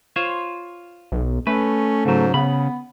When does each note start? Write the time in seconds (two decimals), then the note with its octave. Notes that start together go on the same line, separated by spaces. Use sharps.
0.16 F4 C5 C#5
1.12 B1
1.47 A3 C#4 B4
2.05 G#2 C#3 F#3
2.34 C#3 B3 B5